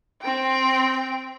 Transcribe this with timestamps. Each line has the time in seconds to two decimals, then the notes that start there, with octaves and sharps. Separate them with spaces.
0.22 C4 G5